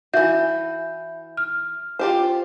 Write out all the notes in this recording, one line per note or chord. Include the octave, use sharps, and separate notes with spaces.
E3 F#4 E5 G6
F6
F4 G4 C5